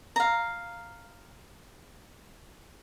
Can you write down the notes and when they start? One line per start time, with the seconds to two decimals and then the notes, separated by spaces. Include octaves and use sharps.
0.16 F5 A#5